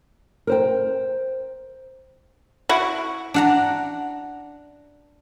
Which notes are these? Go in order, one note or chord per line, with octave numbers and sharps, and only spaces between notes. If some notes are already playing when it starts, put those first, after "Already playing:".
A#4 C5 G5
E4 F#4
D4 F#5 A#5